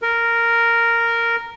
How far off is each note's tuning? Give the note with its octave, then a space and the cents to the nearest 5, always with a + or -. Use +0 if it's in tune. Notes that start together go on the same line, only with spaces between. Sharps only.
A#4 -5